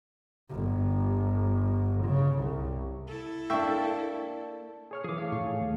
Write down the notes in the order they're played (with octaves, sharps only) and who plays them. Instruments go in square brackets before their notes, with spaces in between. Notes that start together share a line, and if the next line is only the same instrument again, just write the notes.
[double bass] G1
C#3
C2
[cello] E4 A4
[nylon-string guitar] A#3 D4 [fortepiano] E5 G5 C#6
[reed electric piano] G#4 C#5 F6
[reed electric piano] E3 F3 [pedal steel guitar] G#4 D6
[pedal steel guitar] A3 C#5 F5
[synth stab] A2 [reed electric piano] C#6
[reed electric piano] G#4
D#2